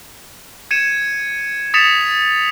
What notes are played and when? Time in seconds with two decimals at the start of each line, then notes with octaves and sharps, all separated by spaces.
0.71 G#6 C#7 D#7 E7
1.74 D#6 A6 B6 C#7 E7 F7